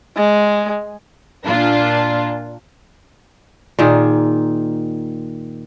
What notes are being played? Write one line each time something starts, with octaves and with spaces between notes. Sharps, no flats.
G#3
A#2 D4 F4
A#2 D#3 G#4